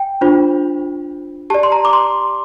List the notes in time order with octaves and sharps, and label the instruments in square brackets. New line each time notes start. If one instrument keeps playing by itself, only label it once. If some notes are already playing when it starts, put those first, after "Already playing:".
Already playing: [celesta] G5
D4 F4 C5
G4 A5
D5
C6
A#5
D6
C6